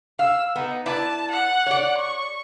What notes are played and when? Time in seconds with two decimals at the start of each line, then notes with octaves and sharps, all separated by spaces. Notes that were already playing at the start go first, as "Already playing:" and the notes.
0.19 F5 E6
0.56 B3 D#4
0.86 E4 B4 D5 A5
1.31 F#5
1.66 C#5 D5
1.97 C#6